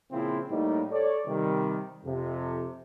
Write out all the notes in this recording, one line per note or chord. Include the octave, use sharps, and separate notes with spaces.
A#2 C#3 F3 C4 E4
A2 G3 A#3 D#4
A4 C#5 D5
C3 D#3 G3
F2 C3